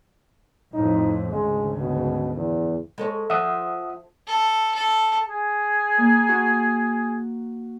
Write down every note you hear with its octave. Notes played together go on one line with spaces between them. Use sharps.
F2 A2 D#4
G#1 D2 C#3 G#3
B2
E2
G#3 A4 C#5
F3 E5 F#5 D#6
A4
A4
G#4
A#3
F#4